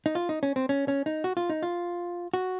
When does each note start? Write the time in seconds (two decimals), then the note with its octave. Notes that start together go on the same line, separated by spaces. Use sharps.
0.06 D#4
0.15 F4
0.29 D#4
0.43 C#4
0.56 C4
0.69 C#4
0.88 C#4
1.06 D#4
1.24 F#4
1.37 F4
1.50 D#4
1.63 F4
2.34 F#4